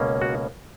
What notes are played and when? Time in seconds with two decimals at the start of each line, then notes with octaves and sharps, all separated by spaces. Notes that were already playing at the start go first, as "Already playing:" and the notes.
Already playing: C#2 B2 A#3 C#4
0.22 F#4